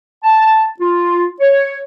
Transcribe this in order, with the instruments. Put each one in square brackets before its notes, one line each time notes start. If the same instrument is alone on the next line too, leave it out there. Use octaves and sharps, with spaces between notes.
[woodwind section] A5
F4
C#5